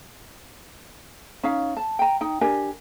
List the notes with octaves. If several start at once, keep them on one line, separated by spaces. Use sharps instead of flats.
C#4 D#4 F5
A5
G5 A#5
D#4 G5
D4 G4 A#4 G#5